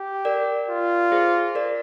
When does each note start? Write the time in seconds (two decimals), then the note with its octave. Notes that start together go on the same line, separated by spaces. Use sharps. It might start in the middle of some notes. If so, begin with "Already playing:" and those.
Already playing: G4
0.25 A#4 D5
0.68 F4
1.12 G#4 C5
1.55 A#4 D5